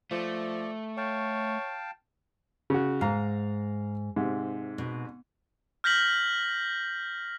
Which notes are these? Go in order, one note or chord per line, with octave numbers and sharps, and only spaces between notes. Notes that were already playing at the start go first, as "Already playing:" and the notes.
F3 A3 D5
C#5 F5 G5 A5
C#3 F#4
G#2 F5 A#5
G#2 C3
B2
F6 G6 A#6 B6 F#7